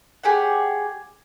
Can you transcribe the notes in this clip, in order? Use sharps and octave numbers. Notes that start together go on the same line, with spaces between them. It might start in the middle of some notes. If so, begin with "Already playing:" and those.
G4 G#4 C#5 F#5